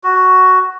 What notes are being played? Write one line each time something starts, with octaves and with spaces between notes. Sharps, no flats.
F#4